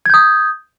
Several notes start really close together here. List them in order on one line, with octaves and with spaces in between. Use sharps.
G#6 G6 D#6